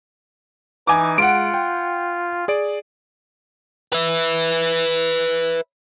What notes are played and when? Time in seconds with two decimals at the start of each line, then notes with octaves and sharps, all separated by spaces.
0.87 E3 D#4 G#5 D6
1.18 G#3 F4 F#5 D7
1.54 G5
2.48 G#4 D5 D7
3.93 B4 E5